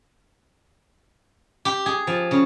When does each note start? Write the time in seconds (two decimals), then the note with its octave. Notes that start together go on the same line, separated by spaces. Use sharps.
1.65 G4
1.86 G#4
2.07 F3
2.31 C#3